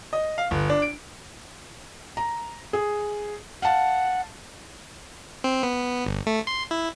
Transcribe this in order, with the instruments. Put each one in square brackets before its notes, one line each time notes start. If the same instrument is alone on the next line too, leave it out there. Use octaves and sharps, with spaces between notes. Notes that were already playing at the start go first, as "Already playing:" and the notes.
[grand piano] D#5
F5
G1
D4
D7
[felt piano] A#5
G#4
[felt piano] F5 A5 [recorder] F#5
[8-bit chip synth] C4
B3
G1
A3
C6
E4